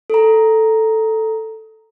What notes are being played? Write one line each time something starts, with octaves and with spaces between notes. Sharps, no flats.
A4 A#5